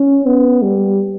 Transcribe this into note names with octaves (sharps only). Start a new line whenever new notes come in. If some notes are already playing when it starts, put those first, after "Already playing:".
Already playing: C#4
B3
G3